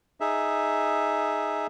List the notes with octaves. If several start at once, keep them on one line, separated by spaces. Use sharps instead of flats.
D#4 G#4 E5